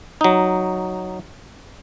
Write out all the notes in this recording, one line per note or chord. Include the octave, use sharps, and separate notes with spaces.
F#3 D#4